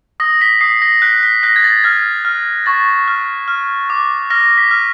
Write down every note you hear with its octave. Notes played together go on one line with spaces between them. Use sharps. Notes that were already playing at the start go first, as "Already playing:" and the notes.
D#6 A#6
B6
D#6 C7
A#6
F#6 B6
B6
F#6 A#6
G#6
A6
F6 G#6
F6
C#6 A6
F6
F6
D6
F6 A#6
B6
F6